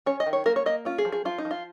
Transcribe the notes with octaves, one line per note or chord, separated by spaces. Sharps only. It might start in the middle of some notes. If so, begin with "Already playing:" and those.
C#4 C#5
D#5
D#3
C#5
A#3 A#4
C#5
A#3 D#5
C#4 F4
G#4
F3
G#4
F3 F4
D#4
F3
F4